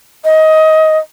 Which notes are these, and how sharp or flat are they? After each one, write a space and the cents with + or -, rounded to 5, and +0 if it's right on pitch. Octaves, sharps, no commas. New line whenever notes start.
D#5 +20